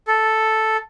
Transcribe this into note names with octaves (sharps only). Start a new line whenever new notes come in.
A4